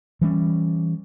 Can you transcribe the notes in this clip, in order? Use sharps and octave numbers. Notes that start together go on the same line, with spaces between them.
E3 G3 C#4